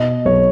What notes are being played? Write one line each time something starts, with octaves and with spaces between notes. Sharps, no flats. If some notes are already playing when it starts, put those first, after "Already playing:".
Already playing: B2 D#5
B1 C#5